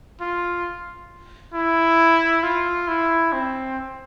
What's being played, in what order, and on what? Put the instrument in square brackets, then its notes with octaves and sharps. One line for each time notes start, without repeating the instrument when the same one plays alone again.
[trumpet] F4
E4
F4
E4
C4